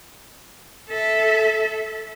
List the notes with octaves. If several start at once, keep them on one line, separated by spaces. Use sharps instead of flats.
A4 E5